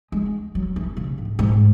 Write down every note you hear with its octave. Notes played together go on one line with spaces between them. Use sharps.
G#3
F#3
E3
C#3
A2
G#2